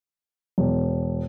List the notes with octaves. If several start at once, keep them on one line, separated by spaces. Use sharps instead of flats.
E1